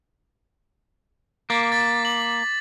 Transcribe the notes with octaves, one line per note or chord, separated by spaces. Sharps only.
A#3 D6 A6 B6
A6 B6
F#7